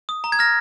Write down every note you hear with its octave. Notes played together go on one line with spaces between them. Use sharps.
D#6
A#5
G#6
F6 A#6